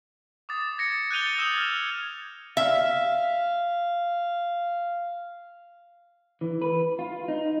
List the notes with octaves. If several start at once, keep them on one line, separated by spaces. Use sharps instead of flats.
D6 D#6 A6
G#6 A#6 C#7
F#6 G6 A6 D#7 F7 G7
D#6 E6 E7 F7 G7
F6 G#6
E5 F5
E3
B4
F4
D#4